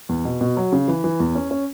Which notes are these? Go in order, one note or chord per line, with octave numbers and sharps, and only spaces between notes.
E2
B2
B2
F#3
C#3
E3
E3
E2
C#4
C#4